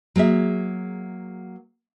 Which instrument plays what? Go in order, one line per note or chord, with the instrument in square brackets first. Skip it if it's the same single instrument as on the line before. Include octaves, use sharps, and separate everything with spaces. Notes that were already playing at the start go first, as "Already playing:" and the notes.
[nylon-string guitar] F#3 A#3 G#4 E5